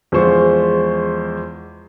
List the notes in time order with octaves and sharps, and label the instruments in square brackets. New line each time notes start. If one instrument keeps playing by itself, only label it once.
[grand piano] E2 F3 G#3 C5 C#6